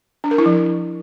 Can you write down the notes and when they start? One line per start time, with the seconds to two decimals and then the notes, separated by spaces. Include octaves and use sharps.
0.24 D4
0.31 A#4
0.38 E4
0.46 F3